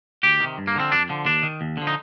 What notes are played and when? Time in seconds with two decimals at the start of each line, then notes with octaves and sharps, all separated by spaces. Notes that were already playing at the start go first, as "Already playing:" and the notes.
0.23 D2 G4
0.40 C3 D#3
0.58 G2
0.67 A#3
0.76 D3 F3 C4
0.92 F2 D4
1.09 D3 F3
1.25 D#2 D4
1.43 D#3
1.61 D#2
1.77 D3 F3
1.87 D#4